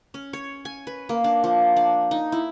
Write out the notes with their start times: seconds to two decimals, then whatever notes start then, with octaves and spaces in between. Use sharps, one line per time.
0.14 C#4
0.33 C#5
0.65 G#5
0.87 B4
1.09 A#3
1.24 D4
1.44 F3
1.76 D4
2.11 D#4
2.32 E4